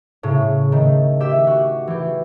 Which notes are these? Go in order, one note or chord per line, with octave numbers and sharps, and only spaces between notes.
A2 C#3
D#3 A3
G4 E5
F#4
E3 G4